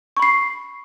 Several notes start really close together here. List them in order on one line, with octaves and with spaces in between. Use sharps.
C#6 B5 C7